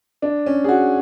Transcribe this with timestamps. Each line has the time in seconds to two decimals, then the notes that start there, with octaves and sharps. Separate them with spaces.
0.22 D4
0.46 C#4
0.64 G#4
0.69 F#4